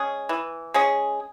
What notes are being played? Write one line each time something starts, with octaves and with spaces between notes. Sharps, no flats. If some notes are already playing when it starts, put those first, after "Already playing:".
Already playing: G#3 C#4 G#4
E3
G#3 C#4 G#4